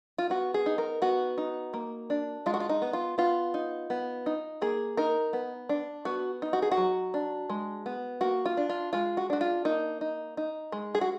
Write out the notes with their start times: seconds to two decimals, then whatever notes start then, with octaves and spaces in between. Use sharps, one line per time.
0.18 F4
0.30 B3 F#4
0.54 G#4
0.66 D#4
0.78 A#4
1.02 B3 F#4
1.38 D#4
1.74 A#3
2.10 D4
2.46 G#3 F4
2.54 F#4
2.60 F4
2.69 D#4
2.82 B3
2.93 F4
3.18 B3 F4
3.54 D#4
3.90 B3
4.26 D#4
4.62 A#3 G#4
4.97 D#4 A#4
5.33 B3
5.69 D4
6.05 B3 F#4
6.42 D#4
6.53 F#4
6.62 G#4
6.72 F#4
6.77 F#3
7.14 D4
7.49 G#3
7.86 B3
8.21 A#3 F#4
8.46 F4
8.57 D4
8.69 F4
8.93 G#3 F4
9.17 F#4
9.30 D4 F#4
9.41 F4
9.65 A#3 D#4
10.01 D#4
10.37 D#4
10.72 G#3
10.95 G#4
11.01 F#4